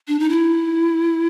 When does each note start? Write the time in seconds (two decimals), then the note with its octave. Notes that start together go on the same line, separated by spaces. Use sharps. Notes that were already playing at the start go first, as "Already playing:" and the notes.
0.08 D4
0.19 D#4
0.29 E4